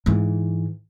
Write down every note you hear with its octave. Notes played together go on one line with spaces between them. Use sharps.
G#2 E3